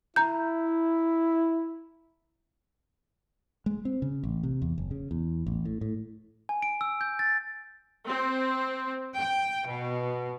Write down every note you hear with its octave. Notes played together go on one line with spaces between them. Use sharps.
E4 A#5 G6
G#3
C4
C#3
A1
C3
E2
F#1
C#3
E2
A1
A2
A2
G#5
D7
E6
G6
A6
C4
G5
B2